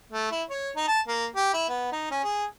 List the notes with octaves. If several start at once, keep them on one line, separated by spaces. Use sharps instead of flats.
A3
E4
C#5
D#4
A5
A#3
G4
E4
B3
D#4
C#4
G#4